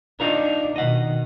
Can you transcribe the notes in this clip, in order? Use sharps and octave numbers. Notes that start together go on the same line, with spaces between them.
D4 D#4 F4 A#4
B2 D#3 D#5 F#5